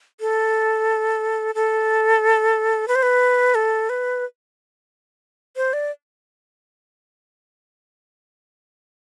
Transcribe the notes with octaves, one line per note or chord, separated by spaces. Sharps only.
A4
A4
B4
C5
B4
A4
B4
C5
D5